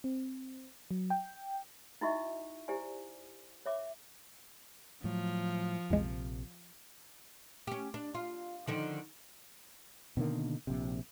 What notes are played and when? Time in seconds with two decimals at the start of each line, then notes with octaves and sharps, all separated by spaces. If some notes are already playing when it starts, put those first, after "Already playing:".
0.04 C4
0.91 F#3
1.10 G5
2.01 D#4 E4 F#4 D#5 E5 C#6
2.68 E4 G4 C5 D5 G#5
3.66 C#5 E5 D6
5.04 A2 F3 F#3
5.90 A#1 E2 C3 G#3
7.67 C#4 G4
7.94 D4
8.14 F4
8.67 D3 D#3 F3
10.17 B2 D3 D#3 A#3
10.67 A#1 C3